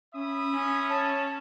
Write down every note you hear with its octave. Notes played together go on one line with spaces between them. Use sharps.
C#4 E5 B5 D#6
C#4 G#5
C#5 A5